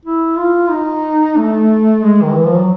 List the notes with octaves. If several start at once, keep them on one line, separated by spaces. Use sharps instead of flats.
E4
F4
D#4
A3
G#3
D#3
E3
F3
F#3